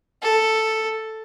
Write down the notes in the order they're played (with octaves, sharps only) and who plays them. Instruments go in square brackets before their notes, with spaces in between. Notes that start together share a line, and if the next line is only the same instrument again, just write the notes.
[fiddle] A4